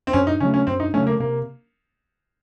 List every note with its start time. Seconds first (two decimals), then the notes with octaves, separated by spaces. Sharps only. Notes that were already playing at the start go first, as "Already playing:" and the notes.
0.07 C4
0.13 F#2 C#4
0.27 D#4
0.40 C#3 F#3 A3 C#4
0.54 C#4
0.67 F#2 C4
0.80 D#4
0.94 C#3 F#3 A3 C#4
1.07 A#3
1.20 C3 A#3